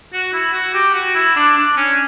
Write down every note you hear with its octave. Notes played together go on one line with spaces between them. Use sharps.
F#4
E4
F#4
G4
F#4
E4
D4
D4
C#4